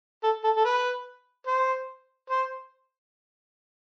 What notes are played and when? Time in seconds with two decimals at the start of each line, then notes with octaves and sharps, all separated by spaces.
0.23 A4
0.44 A4
0.57 A4
0.65 B4
1.47 C5
2.30 C5